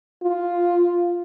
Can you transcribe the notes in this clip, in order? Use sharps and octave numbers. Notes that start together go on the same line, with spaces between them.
F4